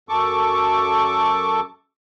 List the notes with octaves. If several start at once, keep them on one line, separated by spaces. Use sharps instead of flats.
F#2 A4 C#6 D6